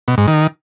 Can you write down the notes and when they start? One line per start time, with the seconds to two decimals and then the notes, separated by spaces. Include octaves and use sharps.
0.08 B2
0.18 G#2
0.28 D#3